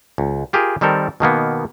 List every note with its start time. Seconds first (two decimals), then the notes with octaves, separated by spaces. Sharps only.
0.18 C#2
0.53 F4 G4 G#4 A#4
0.81 D#3 G3 C4 A4 A#4
1.20 B2 D#3 A#3 B3